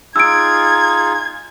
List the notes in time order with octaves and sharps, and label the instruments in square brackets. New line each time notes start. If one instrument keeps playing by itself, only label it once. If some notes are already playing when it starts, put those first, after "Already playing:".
[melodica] D#4 F4 G#4 [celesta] E6 D7 [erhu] G#6